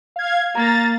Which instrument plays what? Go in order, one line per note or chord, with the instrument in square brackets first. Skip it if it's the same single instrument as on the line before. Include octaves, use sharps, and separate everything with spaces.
[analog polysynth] F5 G#6
[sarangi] A#3 [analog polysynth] A#5 A6